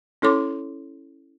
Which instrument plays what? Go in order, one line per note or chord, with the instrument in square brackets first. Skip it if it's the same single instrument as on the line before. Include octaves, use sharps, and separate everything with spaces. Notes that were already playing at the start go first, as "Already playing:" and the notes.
[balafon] C#4 E4 A4 C#5 C6 D6